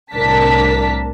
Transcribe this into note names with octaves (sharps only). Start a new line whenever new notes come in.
C2 A2 D4 A#4 A5 B6